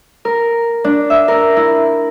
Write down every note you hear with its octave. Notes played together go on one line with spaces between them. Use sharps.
A#4
D4
E5
A#4
E4